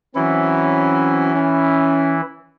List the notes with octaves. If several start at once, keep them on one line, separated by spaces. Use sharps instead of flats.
E3 F#3 C4 C#4 E4
C#4